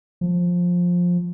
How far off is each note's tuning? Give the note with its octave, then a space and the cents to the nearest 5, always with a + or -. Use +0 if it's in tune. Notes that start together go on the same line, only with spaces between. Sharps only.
F3 +15